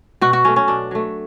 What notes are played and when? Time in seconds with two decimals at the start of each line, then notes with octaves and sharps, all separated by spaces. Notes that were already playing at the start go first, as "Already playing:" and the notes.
0.21 B2 F#4
0.33 F#4
0.45 F#3 A3 C#4
0.56 C#4
0.68 B2 D4
0.91 F#3 A3